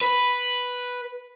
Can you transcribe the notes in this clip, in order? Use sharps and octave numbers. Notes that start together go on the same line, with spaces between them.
B4